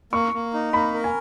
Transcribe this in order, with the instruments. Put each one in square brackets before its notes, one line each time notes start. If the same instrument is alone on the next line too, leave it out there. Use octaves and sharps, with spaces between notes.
[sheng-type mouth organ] A#3 [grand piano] C#6
[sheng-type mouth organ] A#3
D#4
[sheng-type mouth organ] A#3 [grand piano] B5
[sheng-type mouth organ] A#4
[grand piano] G#5